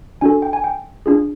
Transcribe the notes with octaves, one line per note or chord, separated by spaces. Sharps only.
D4 F#4 A4 G#5
G5
G#5
G5
D4 F4 G#4